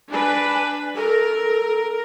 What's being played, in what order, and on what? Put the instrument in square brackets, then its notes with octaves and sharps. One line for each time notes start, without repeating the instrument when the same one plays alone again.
[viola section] D4 B4 [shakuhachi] G#5
[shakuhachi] A4 [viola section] A#4